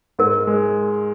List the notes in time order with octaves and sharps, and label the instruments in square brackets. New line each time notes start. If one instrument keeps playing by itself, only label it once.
[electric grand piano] G#2 [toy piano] A#4
[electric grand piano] G#3